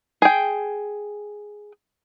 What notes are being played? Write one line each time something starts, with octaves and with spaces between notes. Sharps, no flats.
G#4 G5